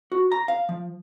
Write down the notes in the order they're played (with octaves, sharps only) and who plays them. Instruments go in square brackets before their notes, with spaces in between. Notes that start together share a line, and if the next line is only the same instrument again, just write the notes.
[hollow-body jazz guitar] F#4
A#5
F5
F3